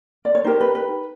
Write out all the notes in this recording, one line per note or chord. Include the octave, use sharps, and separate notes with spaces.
D5
C#5
D#4 G4 A#4 C5
B4
B4